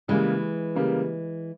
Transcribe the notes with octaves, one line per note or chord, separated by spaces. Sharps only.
C#3 E3 G3 G#3 A#3
C#3 G3 A#3